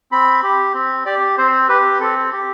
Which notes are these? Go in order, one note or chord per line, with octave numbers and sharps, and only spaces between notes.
C4 B5
G4
C4
G4 D5
C4 C5
G4 B4
C4 A4
G4